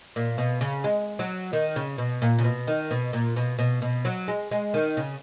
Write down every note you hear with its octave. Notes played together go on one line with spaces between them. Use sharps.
A#2
B2
C#3
G#3
F#3
D#3
C#3
B2
A#2
C#3
B2
D#3
B2
A#2
B2
B2
B2
F#3
G#3
G#3
D#3
C#3